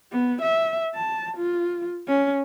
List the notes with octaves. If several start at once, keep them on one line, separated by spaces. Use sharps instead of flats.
B3
E5
A5
F4
C#4